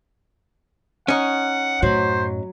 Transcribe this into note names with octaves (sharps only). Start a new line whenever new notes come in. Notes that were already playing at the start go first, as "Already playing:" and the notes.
C#4 D#4 F#5
F#2 A2 F#3 C5 B5